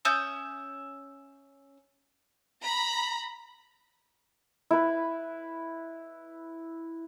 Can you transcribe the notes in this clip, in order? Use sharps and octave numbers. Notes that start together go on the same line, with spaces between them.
C#4 E5 D#6 G6
A#5 B5
E4 B4